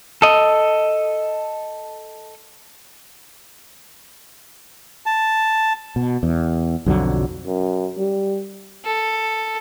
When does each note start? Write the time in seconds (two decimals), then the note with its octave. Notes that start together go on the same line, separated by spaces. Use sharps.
0.22 A4 D#5
5.06 A5
5.96 B2
6.23 E2
6.86 B1 F2 D3 F#3
7.46 F#2
7.97 G3
8.85 A4